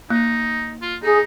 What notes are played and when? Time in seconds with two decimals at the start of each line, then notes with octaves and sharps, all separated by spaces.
0.10 A#3 D#4
0.82 F4
1.03 D#4 G#4